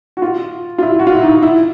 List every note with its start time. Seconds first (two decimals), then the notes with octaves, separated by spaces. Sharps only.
0.17 F#4
0.22 F4
0.78 F4
0.83 E4
0.99 F#4
1.07 F4
1.15 E4
1.23 D#4
1.43 E4